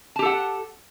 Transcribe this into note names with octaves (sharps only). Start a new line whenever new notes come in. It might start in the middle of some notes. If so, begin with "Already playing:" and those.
G4 A4 F#5 A5